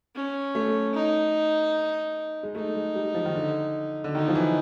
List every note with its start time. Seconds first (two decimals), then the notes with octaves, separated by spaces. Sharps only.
0.15 C#4
0.55 A3
0.95 D#4
2.43 G#3
2.55 A3 D#4
2.75 G#3
2.95 G3
3.15 F3
3.25 D#3
3.35 D3
4.04 D3
4.15 D#3 D#4
4.28 F3
4.35 E3